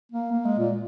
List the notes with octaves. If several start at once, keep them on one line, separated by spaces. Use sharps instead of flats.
A#3
A#3
G#3
A#2